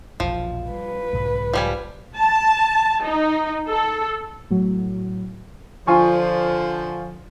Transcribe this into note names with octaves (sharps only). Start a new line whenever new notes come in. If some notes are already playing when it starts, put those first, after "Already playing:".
E1 A#1 F3
G3 B4
B1 G#2 C#3
F3 G3 G#5
A5
D#4
A4
A2 F#3
D3 F3 F4 G#5 C#6